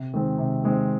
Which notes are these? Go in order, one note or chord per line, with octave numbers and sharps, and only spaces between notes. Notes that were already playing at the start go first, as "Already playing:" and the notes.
Already playing: C3
D#3 G#3 C4
C3
D#3 G#3 C4